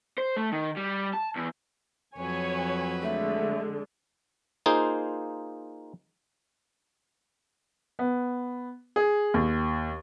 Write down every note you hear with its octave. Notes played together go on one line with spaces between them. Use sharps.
C5
A3
D#3
G3
A5
E2
F2 F#3 B4 C#5 G#5
D3 G#3 A3
A#3 D#4 F4 G#4 C5
B3
G#4
D#2